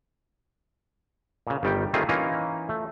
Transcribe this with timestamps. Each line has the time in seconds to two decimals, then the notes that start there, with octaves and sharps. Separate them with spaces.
1.47 A#2 C#3
1.63 G1 D#3 G3 G5
1.94 D#3 G3 A3 C4 F4 G#4
2.09 E3 A#3 C#4 D#4 F4
2.69 A3